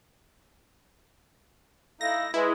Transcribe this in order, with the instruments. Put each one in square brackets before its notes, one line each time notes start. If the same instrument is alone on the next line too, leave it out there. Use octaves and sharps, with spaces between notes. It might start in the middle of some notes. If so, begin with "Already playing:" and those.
[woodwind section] A3 D#4 E4 [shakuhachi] F5 [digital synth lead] A#6
[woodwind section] G#3 [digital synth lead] E4 [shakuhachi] B4